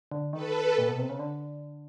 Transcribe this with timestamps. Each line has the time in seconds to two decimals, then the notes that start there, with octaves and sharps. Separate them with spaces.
0.12 D3
0.33 D#3 A4 B4
0.78 A#2
0.88 B2
0.98 C3
1.09 C#3
1.19 D3